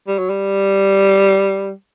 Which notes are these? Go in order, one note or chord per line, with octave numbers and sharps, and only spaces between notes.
G3
F#3
G3